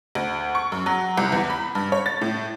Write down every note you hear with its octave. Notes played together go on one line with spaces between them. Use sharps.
D2
C#6
F#2
F#3
C2
E2
B5
G2
C#5
A6
A2